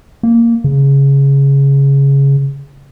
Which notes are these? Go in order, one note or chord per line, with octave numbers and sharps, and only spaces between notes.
A#3
C#3